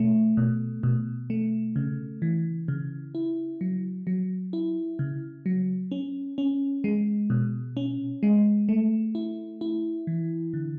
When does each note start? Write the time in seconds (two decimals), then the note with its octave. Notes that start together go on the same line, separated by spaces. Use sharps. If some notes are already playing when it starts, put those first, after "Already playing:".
Already playing: B2 A3
0.37 B2
0.83 B2
1.30 A3
1.76 C#3
2.22 E3
2.68 C#3
3.15 E4
3.61 F#3
4.07 F#3
4.53 E4
4.99 C#3
5.46 F#3
5.91 C#4
6.38 C#4
6.84 G#3
7.30 B2
7.77 C#4
8.23 G#3
8.69 A3
9.15 E4
9.61 E4
10.07 E3
10.54 D3